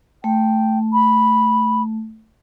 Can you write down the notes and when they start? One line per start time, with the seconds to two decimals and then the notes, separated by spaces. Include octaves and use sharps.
0.24 A3 G5
0.93 B5